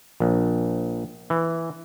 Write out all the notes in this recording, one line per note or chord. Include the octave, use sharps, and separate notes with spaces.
A#1
E3